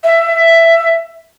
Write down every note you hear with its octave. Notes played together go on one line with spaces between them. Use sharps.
E5